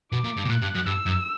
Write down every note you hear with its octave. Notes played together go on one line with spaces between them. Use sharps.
B2 D6
A#2
G2
B2
A#2 F#6
G2
F#2
G2 E6
F#2